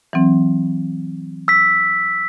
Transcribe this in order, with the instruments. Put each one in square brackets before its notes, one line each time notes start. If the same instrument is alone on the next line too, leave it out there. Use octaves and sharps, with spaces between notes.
[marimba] E3 F#3 C4
[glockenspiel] E6 B6